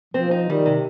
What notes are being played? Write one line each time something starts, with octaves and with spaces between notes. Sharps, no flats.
F3 C4
D#4
D#3 G3
C3